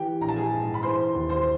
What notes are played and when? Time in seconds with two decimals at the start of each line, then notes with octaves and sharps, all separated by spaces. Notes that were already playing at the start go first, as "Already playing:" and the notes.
Already playing: E3 G4 G5
0.21 A#1 A#5
0.29 A5
0.36 G#4 G#5
0.53 G#2
0.74 B5
0.83 E3 C5 C6
1.15 D#2
1.29 C5 C6